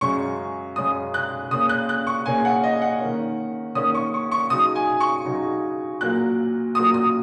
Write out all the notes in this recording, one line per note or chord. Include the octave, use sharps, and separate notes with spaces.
F#2 C#3 G#3 C#4 C#6
F#2 C#3 G#3 C#4 D#6
F#6
C#3 A#3 C#4 D#6
F#6
F#6
C#6
C#3 A#3 C#4 G#5
F#5
D#5
F#5
D#3 A#3 C#4
D#3 A#3 C#4 D#6
C#6
C#6
C#6
C#3 F#3 D#4 D#6
G#5
C#6
C#3 F#3 D#4
A#2 F#3 A#3 F#6
A#2 F#3 A#3 D#6
D#6